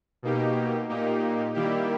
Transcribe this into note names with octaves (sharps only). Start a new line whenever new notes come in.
B2 A#3 D#4 G4
A#2 A#3 D#4 G4
D#3 G3 A#3 E4 G4